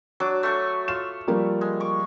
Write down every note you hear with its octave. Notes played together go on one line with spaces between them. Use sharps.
F#3 D4 D6
A3 C#6 D6
F4 E7
F3 G3 A#3
G#3
C#6 D6